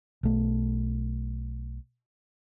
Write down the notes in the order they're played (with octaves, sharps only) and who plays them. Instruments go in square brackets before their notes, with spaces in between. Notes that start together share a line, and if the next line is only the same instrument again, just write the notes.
[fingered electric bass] B1 A3